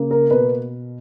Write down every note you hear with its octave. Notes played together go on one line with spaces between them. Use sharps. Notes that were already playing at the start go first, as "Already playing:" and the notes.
Already playing: C#3 A#3
A#4
B2 B4